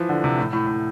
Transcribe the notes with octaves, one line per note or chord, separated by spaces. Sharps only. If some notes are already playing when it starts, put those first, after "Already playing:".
Already playing: E3 F3
D3
C3
A2
A2
A2